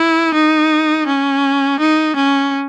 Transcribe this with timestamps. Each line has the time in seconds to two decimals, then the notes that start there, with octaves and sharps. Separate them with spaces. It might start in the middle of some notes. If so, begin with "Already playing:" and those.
Already playing: E4
0.34 D#4
1.07 C#4
1.80 D#4
2.16 C#4